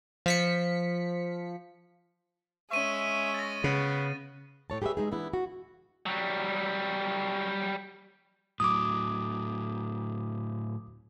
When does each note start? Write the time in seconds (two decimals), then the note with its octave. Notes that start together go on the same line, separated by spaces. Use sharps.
0.26 F3 B6 C#7
2.71 G#3 C#4 E5 C#6 D#7
3.34 A6 A#6
3.64 C#3 B3 A#6
4.70 A2 C#5 A5
4.82 G4 G#4 B4 C#5 E5
4.97 G#3 D#4 G#4
5.11 E3 B3 D4 E4
5.34 F#4
6.06 F#3 G3
8.60 A2 F#3 D6 D#6